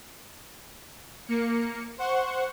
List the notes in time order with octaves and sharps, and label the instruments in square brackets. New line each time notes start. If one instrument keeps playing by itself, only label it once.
[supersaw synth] A#3 C#7
C5 F#5 C#6